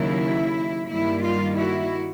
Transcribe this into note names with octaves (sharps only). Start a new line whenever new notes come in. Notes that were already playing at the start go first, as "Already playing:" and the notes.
Already playing: D#2 C#3 F#3 A#3 E4
G2 D#3 G3 A#3 E4
F4
E4 F#4